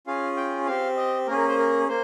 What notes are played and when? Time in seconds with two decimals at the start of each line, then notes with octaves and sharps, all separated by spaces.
0.07 C#4 F4 G#4 F5
0.37 G5
0.67 C4 G4 F5
0.97 D#5
1.27 A#3 C#4 G#4 A#4
1.38 A#4
1.48 C5
1.58 A#4
1.88 A#3 C5